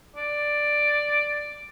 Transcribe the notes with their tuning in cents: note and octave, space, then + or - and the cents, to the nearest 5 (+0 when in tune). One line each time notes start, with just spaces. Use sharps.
D5 +5